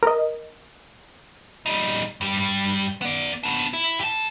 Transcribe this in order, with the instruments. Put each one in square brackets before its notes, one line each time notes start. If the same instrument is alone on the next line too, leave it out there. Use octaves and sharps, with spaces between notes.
[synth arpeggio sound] A#4 D#5
[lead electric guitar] G3 D#4
G2 G3
B3 D5
B3 D4
E4
G4 A5